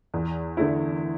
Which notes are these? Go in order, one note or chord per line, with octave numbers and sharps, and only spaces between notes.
E2
D3 A3 E4